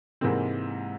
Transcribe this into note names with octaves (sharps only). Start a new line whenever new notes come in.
G#2 C3 E3 G#3 A#3 C4